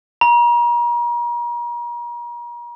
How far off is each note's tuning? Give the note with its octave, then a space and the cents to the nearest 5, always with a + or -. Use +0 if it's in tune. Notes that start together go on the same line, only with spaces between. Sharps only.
A#5 +40